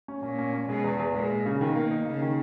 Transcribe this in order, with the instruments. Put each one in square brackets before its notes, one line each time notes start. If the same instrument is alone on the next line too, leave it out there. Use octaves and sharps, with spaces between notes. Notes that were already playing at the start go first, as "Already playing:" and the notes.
[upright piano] C#4
[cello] A#2 [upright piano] C#4
[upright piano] C#4
C#4
[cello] B2 [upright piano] G#3
[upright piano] E2
E2
[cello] A#2 [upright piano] G#3
[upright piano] G#3
C#3
[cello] B2 [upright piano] D#3
[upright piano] A#3
D#4
[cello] C#3 [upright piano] A#3
[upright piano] D#3